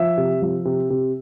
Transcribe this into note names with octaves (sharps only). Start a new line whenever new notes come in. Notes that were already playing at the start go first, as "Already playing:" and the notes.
Already playing: F3 E5
C3
F3
C3
C3